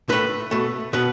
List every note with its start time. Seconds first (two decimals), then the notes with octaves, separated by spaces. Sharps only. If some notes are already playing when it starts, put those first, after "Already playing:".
0.09 A2 A3 B4
0.51 B2 A3
0.93 B2 B3 B4